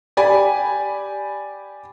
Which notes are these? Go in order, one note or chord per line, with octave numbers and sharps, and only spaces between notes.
G4 D5 G#5 B5